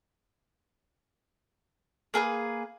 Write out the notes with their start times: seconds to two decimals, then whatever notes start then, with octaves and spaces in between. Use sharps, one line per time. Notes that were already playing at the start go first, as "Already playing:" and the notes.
2.14 A#3 G#4 A4 B4